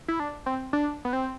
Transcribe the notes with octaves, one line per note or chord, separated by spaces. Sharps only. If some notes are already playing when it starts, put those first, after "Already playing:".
E4
D4
C4
D4
B3
C4